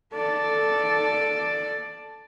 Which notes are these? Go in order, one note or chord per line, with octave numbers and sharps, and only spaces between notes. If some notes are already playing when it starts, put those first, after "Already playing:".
A4 D5